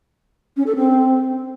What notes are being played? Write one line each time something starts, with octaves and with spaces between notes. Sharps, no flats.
C#4
A4
C4